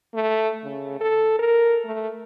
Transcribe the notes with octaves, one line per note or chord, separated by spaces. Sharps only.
A3
C#3
A4
A#4
A3